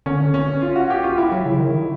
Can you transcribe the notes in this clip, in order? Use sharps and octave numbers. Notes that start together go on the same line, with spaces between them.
D3 C#4
C#4
F4
F#4
G4
F4
E4
F#3
C#3
D#3